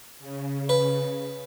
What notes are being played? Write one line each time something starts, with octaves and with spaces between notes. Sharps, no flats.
C#3
B4